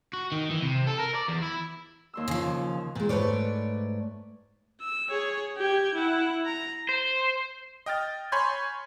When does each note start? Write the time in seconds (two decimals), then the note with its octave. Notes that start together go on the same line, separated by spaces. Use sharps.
0.13 F#4
0.32 D#3
0.51 E3
0.62 C3
0.87 A4
0.99 A#4
1.15 D5
1.28 E2
1.42 E4
2.14 D#2 C6 E6
2.28 C#3 F3
2.95 A#2 G#3
3.09 G#2 A3 B4 C#5 D5
4.81 E6
5.10 G#4 C#5
5.58 G4 G#6
5.95 E4 F#5
6.46 A#5
6.89 C5
7.86 D#5 G5 F6 A6
8.32 C#5 G#5 B5 C6 G6 G#6